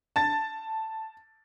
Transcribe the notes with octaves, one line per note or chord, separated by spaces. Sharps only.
A5 A6